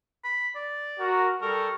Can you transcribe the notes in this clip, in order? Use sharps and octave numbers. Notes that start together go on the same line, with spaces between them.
B5
D5
F#4 A#4
G3 A4 A#4 C#6